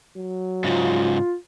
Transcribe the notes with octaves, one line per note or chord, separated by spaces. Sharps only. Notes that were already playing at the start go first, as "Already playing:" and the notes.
F#3
G#2 C#3 F4